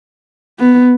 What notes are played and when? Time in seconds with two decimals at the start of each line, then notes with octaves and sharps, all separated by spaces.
0.59 B3